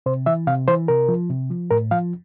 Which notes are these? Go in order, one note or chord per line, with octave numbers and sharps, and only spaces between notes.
C3 C5
E3 E5
C3 F5
E3 C5
C3 A#4
F3
C3
F3
A2 A#4
F3 F5